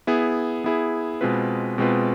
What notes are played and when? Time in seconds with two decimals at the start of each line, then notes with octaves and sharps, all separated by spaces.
0.07 B3 E4 G#4
0.64 B3 E4 G#4
1.21 B2 G#3 C4 F4 B4
1.78 B2 G#3 C4 F4 B4